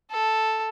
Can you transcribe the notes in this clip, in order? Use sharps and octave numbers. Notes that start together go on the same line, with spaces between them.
A4